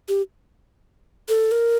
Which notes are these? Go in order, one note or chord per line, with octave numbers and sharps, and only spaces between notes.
G4
A4
A#4